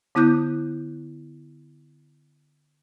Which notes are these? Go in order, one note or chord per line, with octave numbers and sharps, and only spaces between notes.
D3 B3 E4 D6 F#6 G6